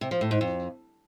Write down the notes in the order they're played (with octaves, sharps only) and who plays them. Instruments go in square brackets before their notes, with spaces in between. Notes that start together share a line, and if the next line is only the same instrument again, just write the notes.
[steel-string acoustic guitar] C3
F3
A2
G#2
F2